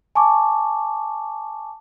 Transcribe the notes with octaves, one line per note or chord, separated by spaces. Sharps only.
G#5 A5 C#6 D6